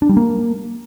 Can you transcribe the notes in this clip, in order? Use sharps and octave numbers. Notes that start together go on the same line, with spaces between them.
D4
G3
A#3